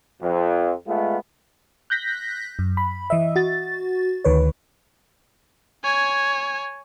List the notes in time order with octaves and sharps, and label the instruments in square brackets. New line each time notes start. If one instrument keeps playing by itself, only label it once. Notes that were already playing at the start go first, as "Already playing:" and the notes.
[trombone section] F2
G#3 A3 B3 F4
[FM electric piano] F#6 G6 A#6 B6
F#2
B5
E3 D#5 E5
F#4 A6
D2 D#3 B4 C#5
[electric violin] C#5 G#5